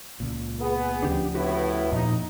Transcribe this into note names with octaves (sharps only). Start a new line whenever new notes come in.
C#2 A#2
B3 G#4
D2 C#3 F3 D4 G4 D5
A2 B3 E4 F#4 G4 B4
F2 A#2 D#4